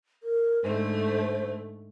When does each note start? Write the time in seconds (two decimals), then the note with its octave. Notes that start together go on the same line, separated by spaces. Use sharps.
0.23 A#4
0.63 G#2 D3 A3 C5